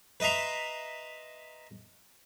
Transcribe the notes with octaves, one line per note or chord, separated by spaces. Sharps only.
B4 D#5 E5 A#5 C6